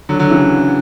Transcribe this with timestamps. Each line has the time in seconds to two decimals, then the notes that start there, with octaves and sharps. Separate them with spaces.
0.09 D3 F#3
0.19 D3 F#3
0.30 C#3 E3